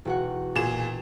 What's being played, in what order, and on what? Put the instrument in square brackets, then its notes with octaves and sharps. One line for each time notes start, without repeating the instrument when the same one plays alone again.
[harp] E1 F#4 F#5
[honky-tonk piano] A#2 G#4 E7